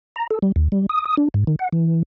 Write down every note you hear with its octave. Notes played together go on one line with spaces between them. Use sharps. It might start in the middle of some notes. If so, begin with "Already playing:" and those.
A#5
A4
G3
D#2
G3
D#6
D#6
D4
G#2
D#3
F#5
E3